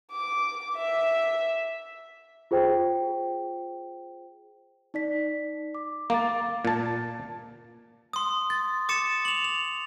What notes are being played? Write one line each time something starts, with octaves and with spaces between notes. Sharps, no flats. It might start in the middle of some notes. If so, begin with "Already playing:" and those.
D6
E5
F4 G#4 C5 G5
D#4 D5 B6
D6
A#3 F5 D6 A6
A#2 A5
C6 D#6
A6
D6 A6 C#7 E7
F7 F#7
F7